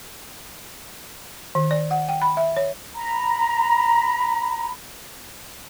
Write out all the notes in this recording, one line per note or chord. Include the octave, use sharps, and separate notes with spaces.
D#3
D5
F#5
G5
B5
E5
C#5
A#5 B5